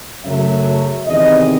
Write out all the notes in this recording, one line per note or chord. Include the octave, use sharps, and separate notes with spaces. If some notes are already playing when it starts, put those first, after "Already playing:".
F#2 C#3 F#3 A3 E5
E2 C3 D#3 G#3 D#5